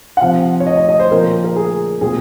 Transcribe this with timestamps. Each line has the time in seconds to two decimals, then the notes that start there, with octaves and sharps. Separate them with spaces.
0.17 F#5
0.21 C3 F3 C4 F5
0.60 C#5
0.67 D#5
0.77 D#5
0.89 D#5
1.00 C5
1.11 A#2 F3 A#3 A#4
1.44 A#4
1.56 G#4
2.01 A#2 F#3 C4 G#4